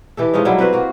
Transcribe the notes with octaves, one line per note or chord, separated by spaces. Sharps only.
E3 G4 A4
F3 G#3 C#4 D#4
F#3 G3 E4
C4 F#4 B4 C5
A#3 F#4